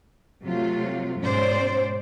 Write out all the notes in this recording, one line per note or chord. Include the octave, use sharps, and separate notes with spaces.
C3 F#3 A3 F4
G#2 B2 C#4 C5 D5